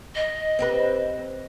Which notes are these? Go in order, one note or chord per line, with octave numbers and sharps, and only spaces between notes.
D#5
C4 G4 B4